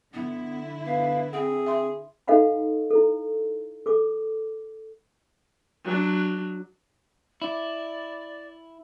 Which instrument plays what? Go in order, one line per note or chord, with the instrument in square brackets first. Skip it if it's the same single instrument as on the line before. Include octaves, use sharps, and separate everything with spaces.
[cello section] D3 E4 [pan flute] B3
[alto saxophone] B3 [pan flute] F5
[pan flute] C4 [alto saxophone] G#4 [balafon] F#5
[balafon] E5 C6
[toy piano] D#4 A4 D#5 F5 F#5 B5
E4 A4
A4 D6
[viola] F#3 D4
[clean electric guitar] E4 [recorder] D5